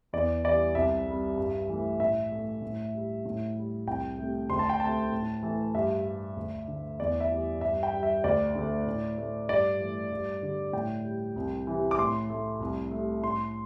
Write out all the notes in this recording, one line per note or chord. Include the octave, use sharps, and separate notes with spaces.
E2 D5
E3 G3 D5
C2 E5
C3 G3
G2
E3 A3
A2 E5
A3
A2
G3
A2
G3
C2 G5
C3 A3
D2 C6
A5
G5
C3 A3 A5
A2
E3 A3
G2 E5
G3
D2
D3 A3
E2 D5
E5
E3 G3
G2 E5
G5
G3
E5
D2 D5
D3 A3
A2
A3
G2 D5
E3 A3
G2
D3 G3
A2 G5
G3
C2
C3 E3
D6
A2 C6
A3
C2
C3 A3
A2 C6